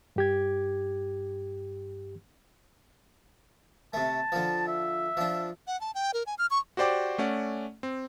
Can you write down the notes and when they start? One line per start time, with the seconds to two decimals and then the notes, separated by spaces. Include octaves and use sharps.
0.16 G2 G4 G#6
3.93 C3 A3 A5
4.32 D3 F3
4.68 E5
5.17 F3 D4
5.67 F#5
5.81 A5
5.95 G5
6.14 A#4
6.26 G#5
6.39 F6
6.51 C#6
6.77 F#4 G4 C5 D5 G5 D6
7.18 A3 C#4 D5 F#5
7.83 C4